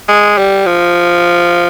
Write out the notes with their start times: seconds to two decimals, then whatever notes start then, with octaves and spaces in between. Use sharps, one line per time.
0.08 G#3
0.38 G3
0.66 F3